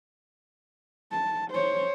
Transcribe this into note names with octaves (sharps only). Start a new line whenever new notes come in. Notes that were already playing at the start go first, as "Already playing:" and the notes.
A5
C5 C#5